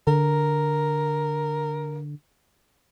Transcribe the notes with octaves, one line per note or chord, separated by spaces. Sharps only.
D3 A#4